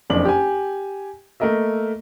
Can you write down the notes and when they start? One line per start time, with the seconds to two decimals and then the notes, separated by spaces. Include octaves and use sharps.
0.10 F#1 F2 D4 D6 F#7
0.25 G4 G#5
1.40 A3 A#3 A#4 D#5 E5